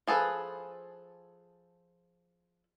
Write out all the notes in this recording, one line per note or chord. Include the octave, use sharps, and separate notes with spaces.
F3 G#4 A4 B4